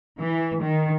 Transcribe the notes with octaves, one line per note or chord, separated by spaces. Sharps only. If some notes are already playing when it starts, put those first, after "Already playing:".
E3
D#3